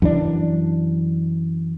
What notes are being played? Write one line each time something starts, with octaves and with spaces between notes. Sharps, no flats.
F#2 E3 D4